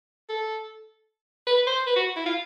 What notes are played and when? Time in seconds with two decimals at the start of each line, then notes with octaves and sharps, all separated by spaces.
0.29 A4
1.47 B4
1.67 C5
1.87 B4
1.96 F#4
2.16 E4
2.26 F4